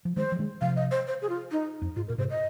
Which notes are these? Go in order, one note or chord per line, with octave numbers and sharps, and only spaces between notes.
F3
D#3 G#3 C5
F3
D#3 G#3
C3 F3 F5
D#5
C5
C5
G#4
F4
D#4
F2
G#2 F4
A#2 A#4
G#2 C3 C5
D#5